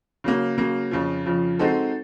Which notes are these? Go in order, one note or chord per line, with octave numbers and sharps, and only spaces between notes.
C#3 F#3 A#3
C#3 F#3 A#3
F2 C#3 F3
F2 C#3 F3
G#3 C4 D#4 F#4 A4